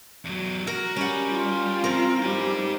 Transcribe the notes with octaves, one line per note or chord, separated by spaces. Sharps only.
E2 F#3
F#4 A#4
G3 C#4 F#5
F4
F3 C4 A#4
G3 D#4 G#5